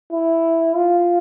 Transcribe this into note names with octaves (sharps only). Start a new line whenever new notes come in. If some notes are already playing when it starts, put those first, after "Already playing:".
E4
F4